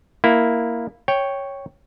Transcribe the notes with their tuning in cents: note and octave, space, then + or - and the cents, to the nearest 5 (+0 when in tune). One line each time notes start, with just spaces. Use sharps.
A#3 +0 E4 +0
C#5 +0 G5 +0